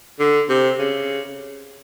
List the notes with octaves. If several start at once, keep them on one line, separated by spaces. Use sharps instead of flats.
D3
C3
C#3